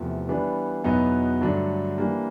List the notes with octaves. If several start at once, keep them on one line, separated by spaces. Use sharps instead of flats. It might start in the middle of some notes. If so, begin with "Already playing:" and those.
Already playing: E2 C3 F3 A3
E3 G3 B3 D4
E2 B2 F#3 B3 D#4
G2 D3 F#3 A3 D4
E3 G3 A#3 D4 G4